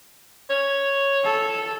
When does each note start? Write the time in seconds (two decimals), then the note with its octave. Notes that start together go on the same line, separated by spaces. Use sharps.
0.50 C#5
1.24 A4